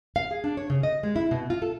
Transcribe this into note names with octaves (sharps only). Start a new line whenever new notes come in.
F5
G#4
D4
C#5
C#3
D#5
G#3
E4
B2
F4
A4